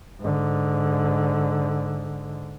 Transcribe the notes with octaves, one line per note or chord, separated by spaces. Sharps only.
G#2 D3